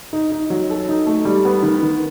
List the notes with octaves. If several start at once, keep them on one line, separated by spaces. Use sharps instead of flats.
D#4
D#4
F#3
A4
D#4
A3
G3
B3
D#3
D#3